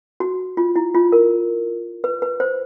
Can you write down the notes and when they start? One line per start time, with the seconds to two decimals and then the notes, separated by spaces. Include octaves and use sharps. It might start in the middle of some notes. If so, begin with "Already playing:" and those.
0.20 F#4
0.57 F4
0.76 E4
0.95 F4
1.12 A#4
2.04 B4
2.22 B4
2.40 C5